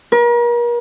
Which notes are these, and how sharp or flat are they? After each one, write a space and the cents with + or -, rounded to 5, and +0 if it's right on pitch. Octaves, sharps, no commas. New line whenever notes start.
A#4 +40